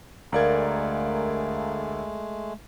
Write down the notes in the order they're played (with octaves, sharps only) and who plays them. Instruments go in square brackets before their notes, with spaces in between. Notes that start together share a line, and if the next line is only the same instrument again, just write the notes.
[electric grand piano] D2 D5 G#6 [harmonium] G#3 A3 [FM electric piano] A#4 F5 A#5